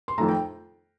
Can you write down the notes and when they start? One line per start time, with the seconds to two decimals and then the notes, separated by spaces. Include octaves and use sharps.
0.08 C6
0.18 F2 D#3 A3 A#5
0.28 G5